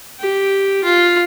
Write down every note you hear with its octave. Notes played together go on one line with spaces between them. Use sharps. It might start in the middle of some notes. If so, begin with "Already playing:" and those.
G4
F4